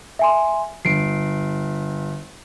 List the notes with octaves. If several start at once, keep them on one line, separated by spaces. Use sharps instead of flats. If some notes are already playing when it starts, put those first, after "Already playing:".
E5 G#5 C6
G1 C7 D7